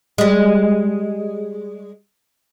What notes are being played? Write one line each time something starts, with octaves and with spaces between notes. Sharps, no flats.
G3 G#3